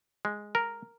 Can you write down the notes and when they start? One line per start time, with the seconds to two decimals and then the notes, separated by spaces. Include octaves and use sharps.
0.25 G#3
0.55 A#4